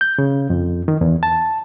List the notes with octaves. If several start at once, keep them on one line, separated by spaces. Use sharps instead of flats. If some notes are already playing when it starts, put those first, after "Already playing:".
G6
C#3
F2
D#3
E2
A5